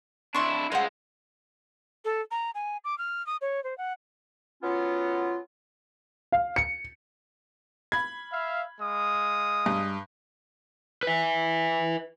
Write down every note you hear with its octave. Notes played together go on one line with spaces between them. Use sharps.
D4 E4 C6 C#6
G#3 F4 C5 F#5
A4
A#5
G#5
D6
F6
D#6
C#5
C5
F#5
F#3 B3 C#4 F4
F5
C#7
B5 G#6
E5 F5
G#3 F5 D#6
G2
B4 E5